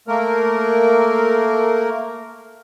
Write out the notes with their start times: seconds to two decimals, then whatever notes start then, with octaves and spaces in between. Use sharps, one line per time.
0.08 A3 A#3 A#4